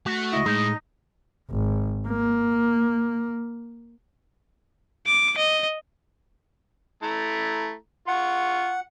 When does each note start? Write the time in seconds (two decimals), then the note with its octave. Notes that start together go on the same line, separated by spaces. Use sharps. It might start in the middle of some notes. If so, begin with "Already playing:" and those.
0.06 A3 F#4
0.33 C#2 E4 D#5
0.46 A2 G#3 D#4
1.50 G#1
2.08 A#3
5.07 D6
5.38 D#5
7.03 A3 E4 A#5
8.08 F4 F#5 C#6